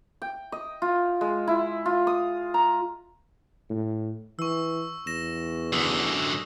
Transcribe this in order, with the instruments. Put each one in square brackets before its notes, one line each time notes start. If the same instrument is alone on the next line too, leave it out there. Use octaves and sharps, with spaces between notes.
[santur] G5
D#5
F4
G#3
E4
F4
D#6
A#5
[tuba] A2
[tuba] E3 [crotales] C#6 E6
[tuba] E2 [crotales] A#6 E7
[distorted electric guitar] F#2 D3 [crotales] D#6 E6